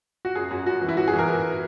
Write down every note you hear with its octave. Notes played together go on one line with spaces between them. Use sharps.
F#4
F#2 G#4
F#2 F#4
F#2 F#4
E3
E4
F#2 F#4
G#4
E3
A#4
E3